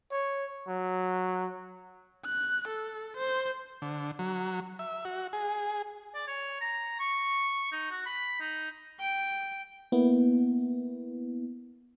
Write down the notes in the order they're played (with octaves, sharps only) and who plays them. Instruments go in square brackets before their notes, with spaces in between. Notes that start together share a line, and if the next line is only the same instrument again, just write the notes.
[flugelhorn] C#5
F#3
[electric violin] F#6
A4
C5
[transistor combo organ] D3
F#3
E5
F#4
G#4
[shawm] D5
C#5
A#5
C#6
D#4
F#4
B5
D#4
[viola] G5
[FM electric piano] A#3 B3 E4